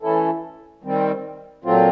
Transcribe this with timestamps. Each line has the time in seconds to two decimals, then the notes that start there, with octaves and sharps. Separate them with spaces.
0.02 E3 A3 C#4 E4 A4
0.83 D#3 G3 C4
1.64 A#2 F#3 A3 C4 F4